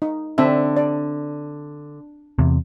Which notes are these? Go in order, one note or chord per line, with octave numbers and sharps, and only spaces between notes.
D#4
D3 C4 E5
D5
E2 C3